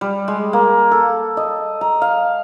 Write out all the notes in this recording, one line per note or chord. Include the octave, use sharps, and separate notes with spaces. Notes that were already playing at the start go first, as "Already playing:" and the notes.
G3
G#3
A#3
A4
D#5
A#5
F5